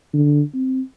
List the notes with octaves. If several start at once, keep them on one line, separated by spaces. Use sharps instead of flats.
D3
C4